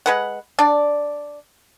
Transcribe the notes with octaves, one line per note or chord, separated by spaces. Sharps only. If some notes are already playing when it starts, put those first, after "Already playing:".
G#3 B4 F#5
D4 D5